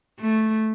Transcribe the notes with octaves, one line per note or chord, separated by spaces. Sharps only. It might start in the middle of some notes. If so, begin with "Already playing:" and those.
A3